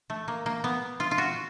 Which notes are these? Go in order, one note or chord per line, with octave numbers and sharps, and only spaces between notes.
A3
A#3
A#3
B3
F4
F4
F#4